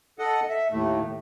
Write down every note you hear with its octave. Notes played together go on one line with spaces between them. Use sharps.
A4 D#5 F#5
E5
D#2 A2 A3